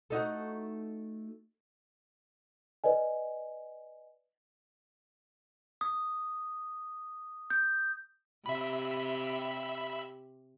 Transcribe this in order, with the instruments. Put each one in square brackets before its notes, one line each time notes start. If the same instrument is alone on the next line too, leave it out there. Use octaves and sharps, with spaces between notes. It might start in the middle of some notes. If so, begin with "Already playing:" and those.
[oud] A3 D#4 F#4
[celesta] B4 D5 D#5 G#5
[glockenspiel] D#6
G6
[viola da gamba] C3 G4 [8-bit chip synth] E5 B5